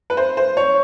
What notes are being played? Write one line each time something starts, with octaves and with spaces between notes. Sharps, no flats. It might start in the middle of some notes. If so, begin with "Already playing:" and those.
B4
C5
C5
C#5